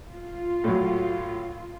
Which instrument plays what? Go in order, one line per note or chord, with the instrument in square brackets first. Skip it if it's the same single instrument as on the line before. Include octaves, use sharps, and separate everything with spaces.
[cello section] F4
[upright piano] A2 F#3